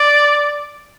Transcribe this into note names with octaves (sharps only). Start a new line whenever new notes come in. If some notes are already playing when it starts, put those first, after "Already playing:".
Already playing: D5